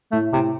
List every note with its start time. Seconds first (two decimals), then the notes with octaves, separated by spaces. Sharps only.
0.12 A2 A3
0.32 A2 C3